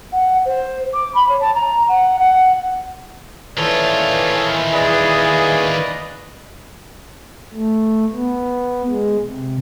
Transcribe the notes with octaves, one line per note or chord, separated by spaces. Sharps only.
F#5
C5
D6
B5
C#5
A5
A#5
F#5
F#5
D#3 E3 F4 A4 C#5 D5
G#4 B4 D5 D#5
A3
B3
G#3
C3